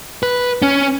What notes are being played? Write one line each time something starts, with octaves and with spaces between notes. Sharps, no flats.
B4
C#4